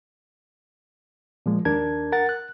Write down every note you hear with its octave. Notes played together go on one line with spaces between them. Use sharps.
A#2 F3 G#3
D#2 D4 A#4 A5 G#6
A#4 F#5 A6
F#6